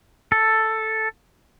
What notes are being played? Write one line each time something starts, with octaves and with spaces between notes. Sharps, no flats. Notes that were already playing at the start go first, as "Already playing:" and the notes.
A4